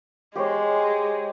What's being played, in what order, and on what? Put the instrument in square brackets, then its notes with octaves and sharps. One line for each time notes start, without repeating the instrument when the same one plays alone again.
[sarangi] G#3 [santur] G4 C5 C#5